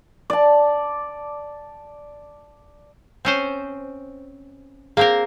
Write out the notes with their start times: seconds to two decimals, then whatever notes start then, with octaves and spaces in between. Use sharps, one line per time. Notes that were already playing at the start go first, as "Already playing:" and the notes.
0.30 D5 A5
3.25 C4 C#4 C5
4.97 A#3 C4 G#4 A#4 F5